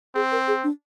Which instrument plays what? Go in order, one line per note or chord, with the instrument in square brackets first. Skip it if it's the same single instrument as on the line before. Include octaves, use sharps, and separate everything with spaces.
[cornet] C4 [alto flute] G#4
[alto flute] A#4
G#4
D4